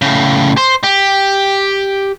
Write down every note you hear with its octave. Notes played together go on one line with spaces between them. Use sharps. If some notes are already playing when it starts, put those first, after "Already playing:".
A2 C#3
C5
G4